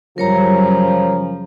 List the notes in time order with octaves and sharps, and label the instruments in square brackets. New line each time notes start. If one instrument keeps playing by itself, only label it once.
[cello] F#2 G3 [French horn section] C#3 F3 [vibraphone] A#4 C#5 A#5